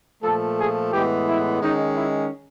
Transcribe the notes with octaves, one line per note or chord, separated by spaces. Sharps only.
A#2 F3 A3 A4
G#4
A2 E3 G#3 B3 G4
E4
D#3 G#3 C#4 D#4
E4